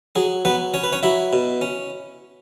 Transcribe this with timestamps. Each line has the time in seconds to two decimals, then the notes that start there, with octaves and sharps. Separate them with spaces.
0.16 F#3 G#4
0.45 F#3 B3 B4
0.74 C#4 C#5
0.84 B4
0.92 C#4 C#5
1.03 F#3 E4 E5
1.33 B2
1.61 C#4